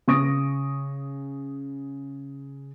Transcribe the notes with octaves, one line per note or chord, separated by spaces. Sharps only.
C#3 C#6 D#6 A#6 D7